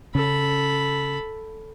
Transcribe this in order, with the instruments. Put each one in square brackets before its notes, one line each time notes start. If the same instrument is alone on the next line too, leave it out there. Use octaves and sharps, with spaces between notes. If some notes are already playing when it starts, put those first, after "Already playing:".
[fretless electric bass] C#3 C#4 [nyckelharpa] A4 B5